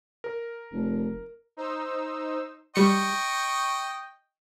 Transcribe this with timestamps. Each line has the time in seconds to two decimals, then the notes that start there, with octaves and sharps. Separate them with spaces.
0.24 A#4
0.72 F1
1.57 D#4 C5 E6
2.76 G3 D#5 G5 C#6 C#7